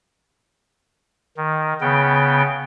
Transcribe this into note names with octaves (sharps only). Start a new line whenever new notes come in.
D#3
C#3 B3 G5